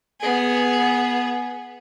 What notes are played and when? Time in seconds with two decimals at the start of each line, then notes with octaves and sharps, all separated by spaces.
0.21 B3 G#4